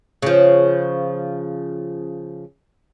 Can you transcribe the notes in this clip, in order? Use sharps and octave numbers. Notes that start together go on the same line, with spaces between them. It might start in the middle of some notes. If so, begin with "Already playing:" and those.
C#3 F3